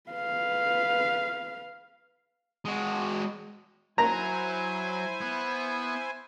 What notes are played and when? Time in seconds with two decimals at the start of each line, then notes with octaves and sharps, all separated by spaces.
0.10 B4 F5
2.65 G#3 F#4
3.98 F#3 E4 C5 G#5 A#5
5.21 B3